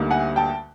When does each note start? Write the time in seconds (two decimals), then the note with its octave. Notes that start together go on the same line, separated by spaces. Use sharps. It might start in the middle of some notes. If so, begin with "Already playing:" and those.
Already playing: D2 D3 G3 A#3 D#4
0.11 F#5 G#5
0.36 G5 A5